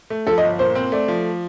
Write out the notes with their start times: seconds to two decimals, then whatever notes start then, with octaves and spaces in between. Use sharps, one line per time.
0.10 A3
0.27 F3 A4
0.38 D#5
0.43 G1
0.59 A#2 C5
0.75 C4
0.92 A3 D5
1.08 F3